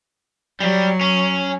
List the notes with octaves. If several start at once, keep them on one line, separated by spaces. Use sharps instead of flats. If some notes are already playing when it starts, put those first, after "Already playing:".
F#3 G3
C#4